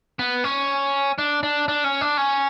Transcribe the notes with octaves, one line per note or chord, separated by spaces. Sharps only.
B3
C#4
D4
D4
D4
C#4
D4
C#4